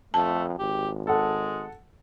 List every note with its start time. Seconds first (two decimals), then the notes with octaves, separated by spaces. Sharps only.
0.14 F2 A3 A5
0.59 G#1 G4
1.07 G#3 A4 F#5